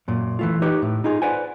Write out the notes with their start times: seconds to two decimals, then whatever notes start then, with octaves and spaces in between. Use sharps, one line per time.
0.08 F#2 A#2
0.39 E3 A3 F4
0.62 D#4 G4 B4 C#5
0.82 A2
1.04 D#4 F4 G#4
1.22 B4 C5 D5 F#5 G#5